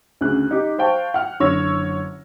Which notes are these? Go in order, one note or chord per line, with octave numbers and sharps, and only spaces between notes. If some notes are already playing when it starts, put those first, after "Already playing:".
D2 C#3 F#6
D#4 G4
C5 F5 G5 A5 C#6
F#5 G5 F6
F#1 D3 C#5 E6 A#6